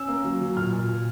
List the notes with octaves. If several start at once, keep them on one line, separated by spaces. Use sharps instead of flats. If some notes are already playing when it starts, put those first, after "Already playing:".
Already playing: C#4 E6
A#3
F#3
F#3
A#2 F6
A#2
A#2